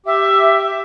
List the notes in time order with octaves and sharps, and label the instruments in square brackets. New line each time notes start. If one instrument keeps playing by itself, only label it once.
[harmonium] G4 [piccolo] E5